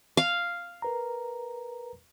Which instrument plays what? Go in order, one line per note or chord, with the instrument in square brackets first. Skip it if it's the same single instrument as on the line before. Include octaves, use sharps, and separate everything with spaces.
[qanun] F5
[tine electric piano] A#4 B4 A#5